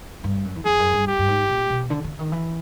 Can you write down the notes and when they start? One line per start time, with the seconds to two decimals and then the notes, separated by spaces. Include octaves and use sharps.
0.24 G2
0.45 F#2
0.55 E2
0.65 F2 G#4
0.79 F#2
0.93 G2
1.07 G4
1.19 G2
1.28 G#2
1.49 A#2
1.70 B2
1.90 D3
2.04 D3
2.19 D#3
2.32 E3